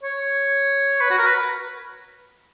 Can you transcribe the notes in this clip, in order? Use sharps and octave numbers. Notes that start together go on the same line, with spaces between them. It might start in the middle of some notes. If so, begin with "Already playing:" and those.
C#5
B4
F#4
A#4
B4